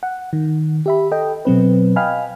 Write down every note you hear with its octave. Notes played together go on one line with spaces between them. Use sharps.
F#5
D#3
G4 E5 B5
A4 D#5 G5
B2 F#3 C4 B4
D#5 F5 G5 G#5 B5 F6